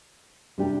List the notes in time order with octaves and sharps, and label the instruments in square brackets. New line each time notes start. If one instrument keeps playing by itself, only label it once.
[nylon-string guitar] C3 G3 D4 G4